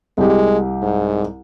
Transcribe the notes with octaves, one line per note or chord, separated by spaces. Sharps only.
C2 G#3 G4
G#2